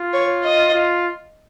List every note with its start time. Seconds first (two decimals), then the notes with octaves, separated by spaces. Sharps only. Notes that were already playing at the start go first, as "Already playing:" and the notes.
Already playing: F4
0.14 C#5
0.44 D#5
0.75 F4